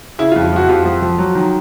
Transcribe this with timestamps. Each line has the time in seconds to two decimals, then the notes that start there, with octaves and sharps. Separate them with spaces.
0.19 C#3 E4
0.32 F4
0.36 F2
0.44 F4
0.52 F3 E4 F#4
0.68 F2 F4 G4
0.85 F3
1.02 F3
1.18 F#3
1.35 D#3